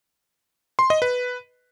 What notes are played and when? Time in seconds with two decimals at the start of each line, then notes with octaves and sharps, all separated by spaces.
0.79 C6
0.90 D#5
1.02 B4